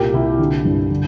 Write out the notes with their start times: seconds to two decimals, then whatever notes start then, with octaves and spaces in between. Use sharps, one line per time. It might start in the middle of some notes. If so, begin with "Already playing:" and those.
Already playing: C2 A#2 G4 A#4
0.13 C2 E4
0.39 D3
0.65 G2
0.90 D3